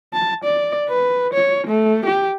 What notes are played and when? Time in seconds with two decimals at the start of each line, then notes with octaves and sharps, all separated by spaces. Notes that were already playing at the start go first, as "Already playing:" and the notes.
0.13 A5
0.44 D5
0.89 B4
1.33 C#5
1.67 A3
2.06 G4